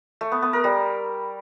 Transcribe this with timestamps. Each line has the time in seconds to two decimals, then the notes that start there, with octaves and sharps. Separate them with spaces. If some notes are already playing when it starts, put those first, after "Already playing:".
0.21 A3
0.32 B3
0.42 B3
0.53 A#4
0.64 G3